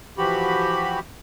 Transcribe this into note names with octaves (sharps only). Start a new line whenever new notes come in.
E3 F3 F#4 G4 B5